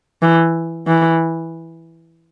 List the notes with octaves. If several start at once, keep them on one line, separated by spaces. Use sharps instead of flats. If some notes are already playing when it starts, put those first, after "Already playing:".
E3
E3